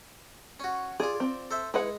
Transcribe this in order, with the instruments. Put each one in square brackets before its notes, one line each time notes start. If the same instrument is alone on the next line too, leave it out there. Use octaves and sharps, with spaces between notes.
[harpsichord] C#4 F#4
[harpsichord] F4 D5 [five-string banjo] G#4
[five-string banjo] C4
[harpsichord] A4 C5 E5
[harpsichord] G#3 [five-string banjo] E4 B4 F#5